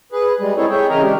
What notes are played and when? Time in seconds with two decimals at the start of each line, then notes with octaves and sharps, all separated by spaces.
0.12 G#4 B4
0.40 G3 G#3
0.57 C4 D#4 E4 G#4 A4 C#5
0.70 G#4 C#5 E5 G5
0.90 C#3 E3 A#4 D#5 A#5
1.02 G#3 D4 G4